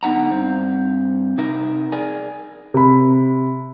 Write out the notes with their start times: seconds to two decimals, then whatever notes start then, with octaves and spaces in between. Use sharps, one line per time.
0.03 D3 B3 D#4 F#5 A#5
0.30 G2 C4
1.38 C3 D#4 A#4 E5
1.92 G#4 A#4 D5 G#5
2.74 C3 B5